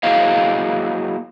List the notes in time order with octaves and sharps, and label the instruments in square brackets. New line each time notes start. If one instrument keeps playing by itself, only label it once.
[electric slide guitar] F#3 A#3 E4 G#4 D#5 F5